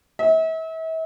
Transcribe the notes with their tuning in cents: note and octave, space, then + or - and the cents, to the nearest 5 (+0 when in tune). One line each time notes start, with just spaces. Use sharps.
E5 -40